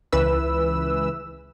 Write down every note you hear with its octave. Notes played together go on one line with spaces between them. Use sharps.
C#2 E3 B4 E6